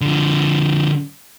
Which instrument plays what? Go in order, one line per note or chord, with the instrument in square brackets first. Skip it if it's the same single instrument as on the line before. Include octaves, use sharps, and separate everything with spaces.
[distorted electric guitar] D3 F3